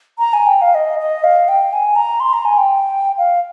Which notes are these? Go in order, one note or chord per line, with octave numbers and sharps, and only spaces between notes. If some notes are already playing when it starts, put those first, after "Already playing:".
A#5
G#5
G5
F5
D#5
D#5
F5
G5
G#5
A#5
C6
A#5
G#5
G5
F5